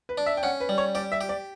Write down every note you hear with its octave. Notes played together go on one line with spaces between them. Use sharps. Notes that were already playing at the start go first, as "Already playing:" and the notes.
B4
D4
E5
G5
C#4 F#5
B4
G3
C#5
G4 D5
E5
G4
D5